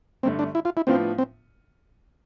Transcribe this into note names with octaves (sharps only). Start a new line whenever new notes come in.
G1 G2 D3 A3 C4
D4
E4
F4
E4
A2 F3 B3 C4 D4 F4
C4